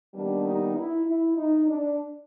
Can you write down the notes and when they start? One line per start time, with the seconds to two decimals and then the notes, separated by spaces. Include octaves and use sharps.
0.14 D#2 D#3 G3 B3 D4
0.45 D#4
0.76 E4
1.06 E4
1.37 D#4
1.68 D4